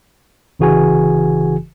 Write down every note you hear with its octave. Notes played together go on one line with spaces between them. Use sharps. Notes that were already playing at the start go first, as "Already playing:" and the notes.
G1 C#3 E3 F#4 G#4 G#5